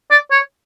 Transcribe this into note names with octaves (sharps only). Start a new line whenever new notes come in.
D5
C#5